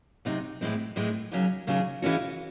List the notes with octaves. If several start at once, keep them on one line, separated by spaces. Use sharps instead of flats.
C3 F#3 C4 D#4
A2 E3 G#3 C4
A2 E3 G#3 C4
D#2 C#3 F#3 C#4 G#4
D#2 C#3 F#3 C#4 G#4
C#3 E3 G#3 C#4 F#4